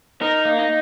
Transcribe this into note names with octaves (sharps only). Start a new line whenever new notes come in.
D#4 A#4
A#3
D#4